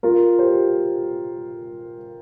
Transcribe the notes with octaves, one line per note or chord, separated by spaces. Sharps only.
F4 A#4
G4 C5